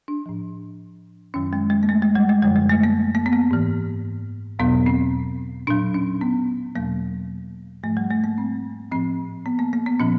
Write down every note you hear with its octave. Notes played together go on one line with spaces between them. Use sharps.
D4
A2 F3
F#2 D#3 F#3 C#4
G#3
G#3
A#3
A3
G#3
G3
G#3
F#2 D3 F3 G3
G#3
A3
A#3
A#3
B3
A#3
G#2 E3
E2 B2 F#3 B3
C4
A#2 F#3 D4
C#4
B3
E2 B2 F#3 A#3
G#2 F3 A3
G3
A3
A#3
C4
A2 F3 C4
B3
A#3
A#3
B3
A#2 F3 C#4